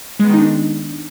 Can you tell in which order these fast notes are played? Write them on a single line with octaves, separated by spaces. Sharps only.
G#3 B3 D#3 D#4 D4